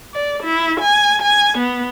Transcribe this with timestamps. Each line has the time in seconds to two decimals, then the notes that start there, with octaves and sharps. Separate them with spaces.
0.14 D5
0.43 E4
0.80 G#5
1.22 G#5
1.58 B3